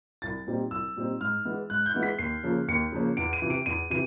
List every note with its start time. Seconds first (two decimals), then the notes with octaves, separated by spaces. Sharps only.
0.22 C2 A6
0.47 A#2 G3 C4 D#4
0.71 C2 E6
0.96 A#2 G3 C4 D#4
1.21 G#2 F6
1.45 E3 G#3 B3 E4
1.70 G#2 F#6
1.86 G6
1.94 E3 G#3 B3 E4
2.03 B6
2.18 D#2 C7
2.43 C#3 F3 A#3 C#4
2.68 D#2 C#7
2.92 C#3 F3 A#3 C#4
3.17 E2 D7
3.33 D#7
3.42 C3 E3
3.50 D7
3.66 E2 D#7
3.90 C3 E3 D#7